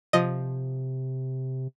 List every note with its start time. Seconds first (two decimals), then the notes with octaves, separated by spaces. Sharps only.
0.13 C3 F3 D#5